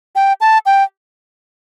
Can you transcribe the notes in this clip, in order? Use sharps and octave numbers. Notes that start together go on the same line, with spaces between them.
G5
A5
G5